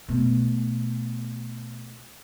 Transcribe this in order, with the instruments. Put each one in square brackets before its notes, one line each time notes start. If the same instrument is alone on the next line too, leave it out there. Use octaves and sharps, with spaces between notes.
[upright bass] B2 A3